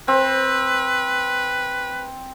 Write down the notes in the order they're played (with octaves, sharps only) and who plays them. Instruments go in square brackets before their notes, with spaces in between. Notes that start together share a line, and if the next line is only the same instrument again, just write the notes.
[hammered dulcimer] C4 [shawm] B4